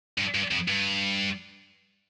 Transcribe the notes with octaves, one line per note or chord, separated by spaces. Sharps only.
G2
G2
F2
G2